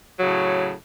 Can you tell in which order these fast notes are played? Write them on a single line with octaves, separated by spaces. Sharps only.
F#3 C#3 A2